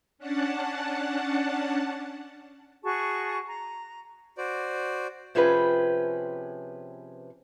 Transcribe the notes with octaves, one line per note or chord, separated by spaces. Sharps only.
C#4 D4 F#5 A5
F#4 G#4 A5 C#6
A#5
F#4 C5 D5
C3 F3 C#4 G#4 B4 G5